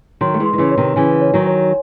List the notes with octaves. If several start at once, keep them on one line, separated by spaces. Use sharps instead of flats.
D#3 F#3 C6
A3
E3 G#3
C6
D#3
C#3 E3
C#5
C3 D#3
C#3 E3 G#5
C#5
D#3 F#3
C#5